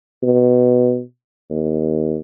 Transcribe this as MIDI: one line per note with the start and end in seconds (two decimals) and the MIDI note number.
0.23 1.01 47
1.50 2.17 39